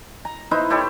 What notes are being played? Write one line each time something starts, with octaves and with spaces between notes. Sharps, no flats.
A#5
D#4 E4 B4 C5
E4 G4 A4 C#5